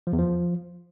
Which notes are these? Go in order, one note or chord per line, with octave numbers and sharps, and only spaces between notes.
F3
E2
F3